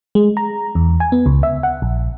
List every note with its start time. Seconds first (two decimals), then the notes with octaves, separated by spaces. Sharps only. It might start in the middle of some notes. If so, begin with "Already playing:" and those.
0.15 G#3
0.37 A#5
0.75 E2
1.00 G#5
1.12 B3
1.26 C#2
1.43 E5
1.63 F#5
1.82 A#1